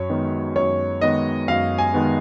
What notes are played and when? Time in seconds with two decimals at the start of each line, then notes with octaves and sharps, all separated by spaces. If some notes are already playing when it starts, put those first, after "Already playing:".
Already playing: F#2 C#5
0.09 D#3 G#3 B3
0.56 F#2 C#5
1.01 D#3 G#3 B3 D#5
1.48 F#2 F5
1.78 G#5
1.94 D#3 G#3 B3